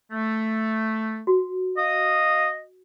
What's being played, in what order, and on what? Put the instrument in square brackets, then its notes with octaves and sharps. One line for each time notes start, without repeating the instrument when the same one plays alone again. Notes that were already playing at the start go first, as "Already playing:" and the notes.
[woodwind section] A3
[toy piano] F#4
[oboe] D#5 [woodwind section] F5 D#6